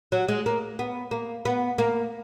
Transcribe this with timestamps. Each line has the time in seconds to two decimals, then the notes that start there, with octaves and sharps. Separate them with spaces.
0.12 F#3
0.29 G#3
0.46 A#3
0.79 B3
1.11 A#3
1.45 B3
1.78 A#3